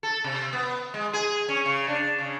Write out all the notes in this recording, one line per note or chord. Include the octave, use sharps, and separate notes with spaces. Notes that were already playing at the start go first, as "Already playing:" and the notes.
A4
C3
B3
G#3
G#4
C#4
C#3
D4
C#3